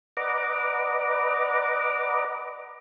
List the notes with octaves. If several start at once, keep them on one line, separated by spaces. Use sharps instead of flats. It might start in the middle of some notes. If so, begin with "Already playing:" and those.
B4 D5 D#5 F#5 A#5 D6